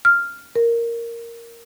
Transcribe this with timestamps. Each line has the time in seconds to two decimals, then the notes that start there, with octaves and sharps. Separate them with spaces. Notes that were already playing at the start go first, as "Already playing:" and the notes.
0.05 F6
0.56 A#4